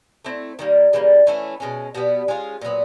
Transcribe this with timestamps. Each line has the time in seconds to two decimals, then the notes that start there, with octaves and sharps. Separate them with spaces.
0.24 A3 C4 E4
0.59 D#3 G3 A#3
0.93 C#3 E3 G3 A#3
1.27 E3 A3 C#4 E4
1.60 B2 G#3 C#4
1.95 B2 G3 B3
2.28 G#3 C#4 F4 G#4
2.62 A#2 F#3 B3